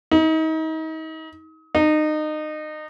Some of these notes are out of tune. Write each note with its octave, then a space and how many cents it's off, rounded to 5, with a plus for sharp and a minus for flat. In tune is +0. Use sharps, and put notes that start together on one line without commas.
D#4 +35
D#4 -25